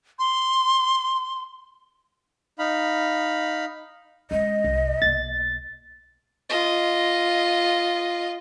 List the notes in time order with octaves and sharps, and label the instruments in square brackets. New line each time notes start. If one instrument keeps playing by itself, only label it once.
[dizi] C6
[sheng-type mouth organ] D#4 F5 B5
[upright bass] G#3 C#4 [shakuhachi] D#5
[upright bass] C2
[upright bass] B1 A#3 [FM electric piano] A6
[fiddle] F4 D#5